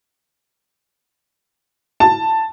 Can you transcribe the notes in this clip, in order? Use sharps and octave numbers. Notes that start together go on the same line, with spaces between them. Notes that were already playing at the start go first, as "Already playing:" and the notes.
A5